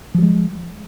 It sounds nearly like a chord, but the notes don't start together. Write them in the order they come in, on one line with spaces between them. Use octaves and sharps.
F3 F#3 G#3